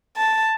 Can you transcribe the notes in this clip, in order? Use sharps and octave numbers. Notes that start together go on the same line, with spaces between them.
A5